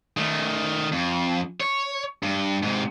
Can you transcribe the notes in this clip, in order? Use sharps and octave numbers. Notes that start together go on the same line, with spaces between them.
D#3 A3
F2
C#5
G2
G#2 C3